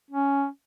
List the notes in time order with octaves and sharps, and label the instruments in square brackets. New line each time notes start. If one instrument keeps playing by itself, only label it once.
[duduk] C#4